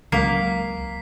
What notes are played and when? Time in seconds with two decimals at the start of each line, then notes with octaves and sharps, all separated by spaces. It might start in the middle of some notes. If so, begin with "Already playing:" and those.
0.12 C#2 F#3 G#3 A#3 B6 C7